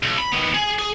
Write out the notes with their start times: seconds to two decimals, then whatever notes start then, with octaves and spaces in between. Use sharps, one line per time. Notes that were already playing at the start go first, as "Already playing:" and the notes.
0.03 B1
0.19 B5
0.33 D#3 B3
0.54 G#4
0.79 G#4